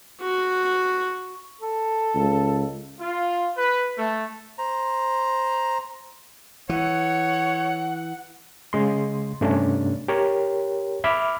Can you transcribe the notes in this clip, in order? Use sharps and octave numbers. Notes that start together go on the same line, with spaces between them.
F#4
A4
C#2
F4
B4
A3
C5 A#5
E3 C#5 F#5
C#3 G#3 C6
G2 C3 A3 C#4 D4
G4 A#4 C#5
E5 B5 D6 F6